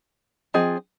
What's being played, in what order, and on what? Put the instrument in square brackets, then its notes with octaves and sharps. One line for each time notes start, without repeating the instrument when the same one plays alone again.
[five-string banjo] F3 C4 G#4 D#5